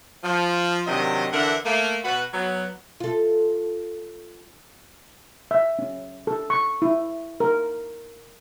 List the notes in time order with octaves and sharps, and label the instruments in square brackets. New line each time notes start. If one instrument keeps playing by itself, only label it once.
[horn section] F3
C3 D#3 F#3 D4 D#5
D3 E3 D4 A#4 E5 F#5
A3 A#3
B2 F#4 B4
F#3 B3
[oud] F4 A4
[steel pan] E5
C#4
A4
C#6
E4
A#4